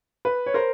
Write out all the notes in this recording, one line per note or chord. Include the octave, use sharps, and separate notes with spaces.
B4
C#5
A#4 C5